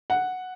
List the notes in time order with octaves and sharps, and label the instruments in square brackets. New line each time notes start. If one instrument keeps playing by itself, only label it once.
[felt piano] F#5